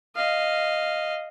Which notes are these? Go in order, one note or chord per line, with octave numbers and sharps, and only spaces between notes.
D#5 F5